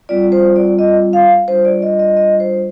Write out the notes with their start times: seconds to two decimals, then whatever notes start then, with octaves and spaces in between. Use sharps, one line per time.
0.09 G3 C4 F4 D5
0.32 C5
0.56 D5
0.79 D#5
1.13 F5
1.48 G3 D4 F4 C5
1.65 D5
1.82 D#5
1.99 D#5
2.17 D#5
2.40 C5